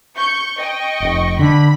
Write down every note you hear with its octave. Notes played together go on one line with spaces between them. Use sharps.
C#6 G6 C#7
D#5 G5 C#6
F1
D3 B5